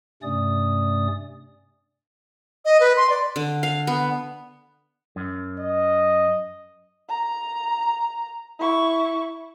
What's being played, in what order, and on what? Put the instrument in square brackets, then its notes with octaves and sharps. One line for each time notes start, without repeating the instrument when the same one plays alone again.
[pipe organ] G2 C3 A3 C#4 D5 D#6
[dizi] D#5
B4
C6
D5
[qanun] D3
F5
B3
[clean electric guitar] F#2
[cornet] D#5
[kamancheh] A#5
E4 C#6